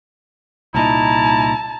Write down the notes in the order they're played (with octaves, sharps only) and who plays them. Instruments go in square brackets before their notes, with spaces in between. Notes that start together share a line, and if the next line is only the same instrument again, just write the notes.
[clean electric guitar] C2 A#2 D#4 [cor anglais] E4 [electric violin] A5 [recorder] A#5